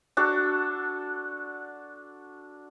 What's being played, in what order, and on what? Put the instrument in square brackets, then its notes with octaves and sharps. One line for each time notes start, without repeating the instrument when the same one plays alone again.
[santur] D4 F#4 A4